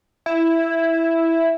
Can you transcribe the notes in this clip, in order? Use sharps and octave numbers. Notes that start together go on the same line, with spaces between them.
E4